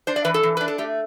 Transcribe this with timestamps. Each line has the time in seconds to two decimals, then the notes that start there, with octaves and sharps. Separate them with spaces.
0.07 D4 C5
0.16 D5
0.25 E3 B4
0.34 A4
0.43 E3
0.57 D4 B4
0.68 A4
0.78 A3 G4